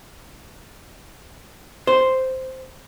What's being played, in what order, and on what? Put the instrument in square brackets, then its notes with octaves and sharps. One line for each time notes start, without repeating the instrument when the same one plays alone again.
[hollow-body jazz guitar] C5